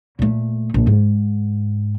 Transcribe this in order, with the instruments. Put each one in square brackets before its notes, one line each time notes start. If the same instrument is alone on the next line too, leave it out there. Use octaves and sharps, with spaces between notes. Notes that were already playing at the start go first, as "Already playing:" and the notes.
[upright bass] A#2 A3
A#1
G#2